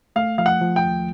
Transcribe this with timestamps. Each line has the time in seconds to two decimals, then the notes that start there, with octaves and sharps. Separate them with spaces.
0.16 A3 F5
0.38 F3 F5
0.46 F#5
0.61 F3
0.76 G5
0.84 D#2